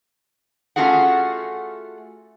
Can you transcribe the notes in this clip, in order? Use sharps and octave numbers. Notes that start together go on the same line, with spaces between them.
A3 C#4 F4 F#4 G#4 F#5